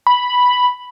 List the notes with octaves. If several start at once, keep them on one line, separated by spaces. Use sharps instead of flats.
B5